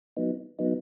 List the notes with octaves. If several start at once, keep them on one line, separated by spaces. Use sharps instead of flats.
F#3 B3 D#4
F#3 B3 D#4